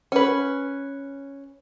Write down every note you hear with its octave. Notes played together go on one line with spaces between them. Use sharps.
C#4 B4